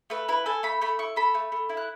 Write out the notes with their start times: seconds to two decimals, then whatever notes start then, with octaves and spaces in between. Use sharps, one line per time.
0.10 A3 B4
0.28 E4 B4
0.46 A4 G#5
0.63 A3 B5
0.81 A3 B5
0.99 E4 C#6
1.16 A4 B5
1.34 A3
1.52 A3
1.69 E4
1.77 F#6